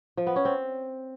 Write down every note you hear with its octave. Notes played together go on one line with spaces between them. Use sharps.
F3
B3
C#4
C4